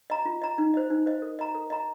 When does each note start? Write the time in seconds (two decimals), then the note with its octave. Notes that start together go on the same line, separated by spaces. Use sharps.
0.10 D#5 A#5
0.25 F4
0.42 D#5 A#5
0.58 D#4
0.74 C5 D#5
0.90 D#4
1.06 C5 D#5
1.22 A#4
1.39 D#5 A#5
1.55 A#4
1.70 D#5 A#5